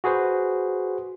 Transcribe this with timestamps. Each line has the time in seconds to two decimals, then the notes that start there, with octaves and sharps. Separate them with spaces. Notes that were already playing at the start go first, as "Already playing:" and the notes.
0.04 F#4 G#4 B4 C5